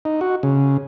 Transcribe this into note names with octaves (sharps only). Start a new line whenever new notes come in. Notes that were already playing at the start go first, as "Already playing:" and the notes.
D#4
F#4
C#3